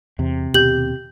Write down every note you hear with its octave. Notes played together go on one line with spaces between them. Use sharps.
E2 C3
D#2 B2 C4 G4 G6 F#7